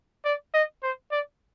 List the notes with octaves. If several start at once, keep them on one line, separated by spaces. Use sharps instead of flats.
D5
D#5
C5
D5